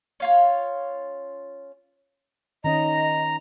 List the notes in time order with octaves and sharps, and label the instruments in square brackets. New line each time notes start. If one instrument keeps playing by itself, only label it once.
[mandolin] C#4 F4 C#5
[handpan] D#3 C#4 [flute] D#5 [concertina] A#5